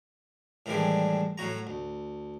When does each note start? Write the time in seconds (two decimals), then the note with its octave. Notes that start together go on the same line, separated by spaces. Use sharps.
0.66 A2 D#3 E3 G3 G#3 D4
1.38 A2 F#3 F#4 A#5
1.67 D2